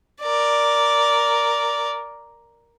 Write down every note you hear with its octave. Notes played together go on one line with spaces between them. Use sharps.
A#4 D5